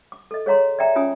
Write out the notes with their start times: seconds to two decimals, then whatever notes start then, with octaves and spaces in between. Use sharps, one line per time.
0.12 D6
0.31 A4 D#5
0.46 G#4 C#5 F5 A#5 C6
0.79 D5 E5 G5 A#5
0.96 C#4 F4 G#5 D#6